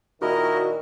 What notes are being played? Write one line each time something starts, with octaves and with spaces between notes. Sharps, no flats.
A#2 D#3 E4 F#4 A#4 D#5